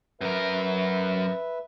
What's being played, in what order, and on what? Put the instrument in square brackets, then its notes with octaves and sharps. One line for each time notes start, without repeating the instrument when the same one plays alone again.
[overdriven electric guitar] F#2 A#4 [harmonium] B4 E5